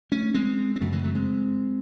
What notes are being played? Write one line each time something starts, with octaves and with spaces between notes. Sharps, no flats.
A3 C#4
G#3 C4
C4
F#2 C#3 F#3 A3
E3 G#3
F#3 A3
G#3 C4